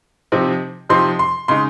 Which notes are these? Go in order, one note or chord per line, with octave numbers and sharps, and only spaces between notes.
C3 F3 C4 D#4
C3 F3 C4 D#4 C6
C6
C#3 G#3 D#4 C6